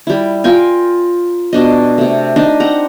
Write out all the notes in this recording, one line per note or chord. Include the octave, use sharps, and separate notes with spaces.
G3 E4
F4 A#4 G5 G#5
B2 D4 D#5
C3 A3
D4 D#4 D#5
C4 F#5 A#5